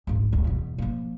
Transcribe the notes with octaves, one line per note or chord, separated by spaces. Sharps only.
D1 G#1
D1
E2 B2
F3 A#3